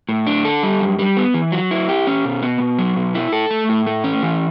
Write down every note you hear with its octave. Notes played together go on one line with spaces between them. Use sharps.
A2
D4
A4
G3
F#2
G3
B3
E3
F#3
E4
G4
C#4
B2
B3
B2
F#3
B2
E4
A4
A3
A2
A3
C#4
E3